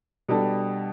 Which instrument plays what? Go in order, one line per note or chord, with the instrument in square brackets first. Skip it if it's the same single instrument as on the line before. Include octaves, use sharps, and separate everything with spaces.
[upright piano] B2 G3 D4 A4